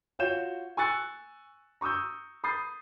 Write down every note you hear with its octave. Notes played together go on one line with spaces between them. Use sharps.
F4 F#4 C#5 F5 G6 E7
G#5 C#6 E6 F#6 A6 C#7
A#5 C#6 D#6 E6 G6
B5 D#6 G6 A6 C7